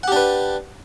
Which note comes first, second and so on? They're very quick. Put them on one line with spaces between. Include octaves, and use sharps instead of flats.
F#5 G4 D4 B4